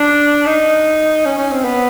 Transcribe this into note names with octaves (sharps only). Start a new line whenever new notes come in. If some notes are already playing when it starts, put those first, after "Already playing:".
Already playing: D4
D#4
C#4
C#4
C4
B3